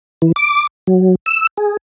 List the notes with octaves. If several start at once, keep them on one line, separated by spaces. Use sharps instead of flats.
E3
D6
F#3
E6
G#4